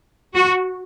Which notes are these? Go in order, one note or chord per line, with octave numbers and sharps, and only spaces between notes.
F#4